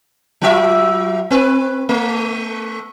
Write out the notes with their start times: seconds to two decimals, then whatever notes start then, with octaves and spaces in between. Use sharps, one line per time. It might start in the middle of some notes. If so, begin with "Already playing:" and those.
0.41 F#3 F4 E5
1.30 C4 B4
1.89 A3